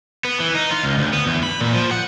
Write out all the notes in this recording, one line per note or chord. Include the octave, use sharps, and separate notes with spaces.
B3
E3
D#4
F4
C#2
D2
B3
E2
B5
A#2
F3
F#5